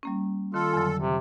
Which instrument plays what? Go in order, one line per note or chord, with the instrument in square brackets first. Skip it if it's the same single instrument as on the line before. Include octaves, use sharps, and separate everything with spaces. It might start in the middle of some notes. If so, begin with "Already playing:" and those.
[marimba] G3 A#3 C#4
[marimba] D#3 [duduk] F4 [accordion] A4
[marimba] F2 D3 F#3
[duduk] C3